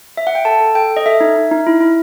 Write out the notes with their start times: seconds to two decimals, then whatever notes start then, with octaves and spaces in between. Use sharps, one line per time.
0.17 E5
0.27 F#5
0.35 G5
0.45 A4 A5
0.60 A4
0.75 A4 G5
0.90 A4
0.97 D#5
1.06 A4 E5
1.21 D#4
1.36 D#4
1.51 D#4
1.67 E4
1.81 E4